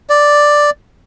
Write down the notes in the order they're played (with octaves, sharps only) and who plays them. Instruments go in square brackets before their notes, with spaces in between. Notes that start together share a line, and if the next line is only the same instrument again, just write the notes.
[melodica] D5